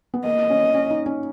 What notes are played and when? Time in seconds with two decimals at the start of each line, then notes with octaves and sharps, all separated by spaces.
0.14 B3
0.25 A#3 D#5
0.50 C#4
0.74 C#4
0.91 D#4
1.06 C#4